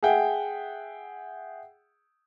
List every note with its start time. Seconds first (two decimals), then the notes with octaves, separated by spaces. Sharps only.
0.03 G#4 E5 F#5 G5